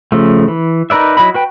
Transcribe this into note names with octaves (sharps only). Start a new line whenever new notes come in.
C#3 F3 A3
E3
D#4 A#4 B4 D5 E5
F#3 E4 D#5 B5
F#4 B4 G5